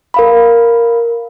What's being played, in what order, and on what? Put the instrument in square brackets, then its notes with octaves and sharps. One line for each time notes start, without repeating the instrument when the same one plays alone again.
[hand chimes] A#4 F5 B5